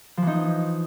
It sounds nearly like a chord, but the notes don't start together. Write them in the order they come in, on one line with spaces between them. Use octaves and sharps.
F3 E3 D#4